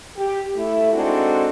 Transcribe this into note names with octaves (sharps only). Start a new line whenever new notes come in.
G4
A3 E4
G#3 C4 D4 D#4 F#4 A4